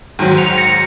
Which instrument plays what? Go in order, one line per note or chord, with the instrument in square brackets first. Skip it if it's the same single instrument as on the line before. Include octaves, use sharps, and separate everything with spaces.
[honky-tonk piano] G#2 D#3 F#3
[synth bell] C#7 F7
A#6 C#7